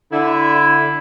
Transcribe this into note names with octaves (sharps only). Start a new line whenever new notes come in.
D3 E4